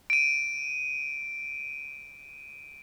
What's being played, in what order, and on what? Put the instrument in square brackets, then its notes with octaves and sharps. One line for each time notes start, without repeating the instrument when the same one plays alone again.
[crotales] D7 D#7